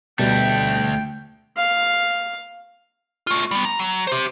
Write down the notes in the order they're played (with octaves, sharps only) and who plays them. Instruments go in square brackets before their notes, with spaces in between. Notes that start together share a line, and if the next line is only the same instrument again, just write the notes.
[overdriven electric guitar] D2 A3 [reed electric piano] B2 G3 [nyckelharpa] G5
[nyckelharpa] F5
[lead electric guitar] A3 F4
G3 B3
A#5
F#3
G4 C5